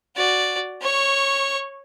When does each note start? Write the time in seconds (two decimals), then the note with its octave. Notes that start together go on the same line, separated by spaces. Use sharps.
0.16 F#4 D5
0.81 C#5 C#6